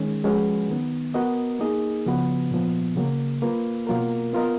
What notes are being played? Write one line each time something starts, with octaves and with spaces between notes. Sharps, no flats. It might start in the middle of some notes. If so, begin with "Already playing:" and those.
Already playing: D#3 G#3 C#4
F3 G#3 C#4 F#4 B4
D#3 F#3 B3
B3 F#4 A#4 D#5
A#3 D#4 G#4 D#5
C#3 F3 B3 F#4 B4
A#2 F3 B3
C#3 F#3 A#3
A#3 F4 B4
B2 F#3 A#3 F4 A#4
B3 F4 A#4 D#5